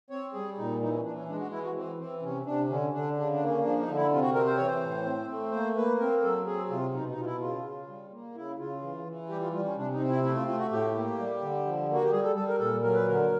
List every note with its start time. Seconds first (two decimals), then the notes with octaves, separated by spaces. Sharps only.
0.10 C4 C#5
0.33 G3 G#4
0.58 A#2 D#4
0.80 E3 D#4
0.92 C#4
1.04 E3 D4
1.16 C#4
1.28 G#3 D4
1.39 F#4
1.51 E3 E4
1.64 F#4
1.75 E3 C4
1.98 E3 C4
2.22 C3 C#4
2.46 C3 D4
2.69 D3 C#4
2.93 D3 D4
3.17 C#3 D4
3.33 D4
3.40 A#3
3.49 C#4
3.63 F3 D4
3.80 D#4
3.88 D3
3.96 E4
4.11 C3 F4
4.22 F#4
4.34 C4 A#4
4.47 C5
4.57 E3 C#5
4.67 C5
4.81 A2
5.05 C4
5.28 A3
5.52 A#3 C5
5.76 A#3 B4
5.99 C4 A#4
6.22 F#3 A4
6.46 C4 G#4
6.70 C3 F4
6.94 B2 D#4
7.10 D#4
7.17 B2 F4
7.26 E4
7.41 C#3 F4
7.65 C#3
7.88 G3
8.11 A#3
8.35 C#3 E4
8.58 C#3 F4
8.82 E3
9.06 E3
9.29 G3 G4
9.41 F4
9.52 G3 F4
9.65 C#4
9.77 C3 D4
9.92 D#4
10.00 C4
10.09 E4
10.23 A3 E4
10.36 F4
10.47 A3 F4
10.58 F#4
10.71 A2 G4
10.95 A#3
11.19 G3
11.41 D3
11.66 F3
11.89 A#3
11.94 F#4
12.02 G4
12.12 G3 G#4
12.23 A4
12.36 G3 A4
12.48 A#4
12.59 A#2 A4
12.82 F#3 A#4
12.95 B4
13.07 D3 A#4